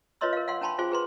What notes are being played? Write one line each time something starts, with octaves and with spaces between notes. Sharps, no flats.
F4 B4 C#5 D#5 C6 E6
A#4 F5
F5 F#5 C6
D4 G5 A5 B5 C6
F4 G#4 C5 G#5 C6
G#4 B4 C6